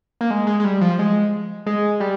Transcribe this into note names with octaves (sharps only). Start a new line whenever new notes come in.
A#3
G#3
G#3
G#3
G3
F3
G#3
G#3
G3